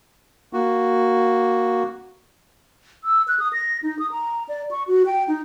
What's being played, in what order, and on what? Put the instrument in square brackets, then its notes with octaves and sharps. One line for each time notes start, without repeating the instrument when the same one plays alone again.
[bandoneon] A#3 F#4
[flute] E6
F#6
D#6
A#6
D#4
D#6
A#5
D5
C#6
F#4
G5
D#4